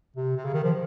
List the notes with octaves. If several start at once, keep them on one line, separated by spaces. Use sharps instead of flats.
C3
C3
C#3
D#3
F3